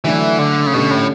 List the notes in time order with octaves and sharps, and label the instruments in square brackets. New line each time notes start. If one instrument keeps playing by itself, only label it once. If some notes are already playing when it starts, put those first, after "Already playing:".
[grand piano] D3 F#3 A3 D4 [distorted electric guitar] E3
[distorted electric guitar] D3
C#3
[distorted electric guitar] B2 [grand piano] D3 A3 C#4 G4
[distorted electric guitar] A2